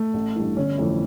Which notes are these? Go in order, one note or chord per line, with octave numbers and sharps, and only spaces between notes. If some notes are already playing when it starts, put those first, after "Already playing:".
Already playing: A3
A1
G2 E3
G1 C#4
F2 E3 A3